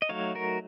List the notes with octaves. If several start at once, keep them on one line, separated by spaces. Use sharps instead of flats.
D#5
F#3 A3 D#4 C#5 F5
F#4 A#4